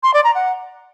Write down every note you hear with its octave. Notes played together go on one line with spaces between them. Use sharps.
C6
D5
A#5
F#5